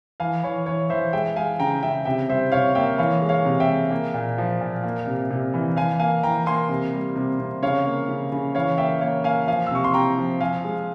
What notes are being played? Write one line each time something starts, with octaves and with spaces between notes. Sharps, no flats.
E3 F5 G#5
E3 C#5
E3 C#5
E3 C5 E5
G#3 E5 G5
G#3 F5 G#5
C#3 G5 A#5
C#3 E5 G5
C3 E5 G5
G3 C5 E5
C3 C#5 F5
A#3 E5 G5
E3 C#5 F5
G#3
C#5 F5
C3
E5 G5
G#3
A#3
A#2
F3
A#2
A#3
C3
C3
E3
E3 F5 G#5
A#3 F5 G#5
E3 G5 A#5
A#3 G#5 C6
C3
G3
C3
C3
C#3 C#5 F5
A#3
C#3
C#3
E3 C#5 F5
A#3 E5 G5
A#3 C#5 F5
A#3 F5 G#5
F3 F5 G#5
E6
C3 C#6
C6
C3 G5 A#5
F3
F3 F5 G#5
G#3